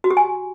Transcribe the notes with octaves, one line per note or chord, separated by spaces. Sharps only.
F#4
G4
G#5